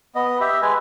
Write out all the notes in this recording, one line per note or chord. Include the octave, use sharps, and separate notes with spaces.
B3 D#5
G4 E5
G#3 B4 G#5